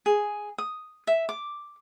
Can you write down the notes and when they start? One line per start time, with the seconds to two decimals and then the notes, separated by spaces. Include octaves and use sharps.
0.06 G#4
0.58 D#6
1.07 E5
1.29 D6